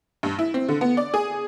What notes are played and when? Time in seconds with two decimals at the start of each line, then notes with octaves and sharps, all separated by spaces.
0.23 G2
0.39 E4
0.54 C4
0.68 D3
0.81 B3
0.97 D5
1.14 G#4